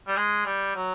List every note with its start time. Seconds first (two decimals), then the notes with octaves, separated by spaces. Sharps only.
0.07 G3
0.16 G#3
0.45 G3
0.76 F#3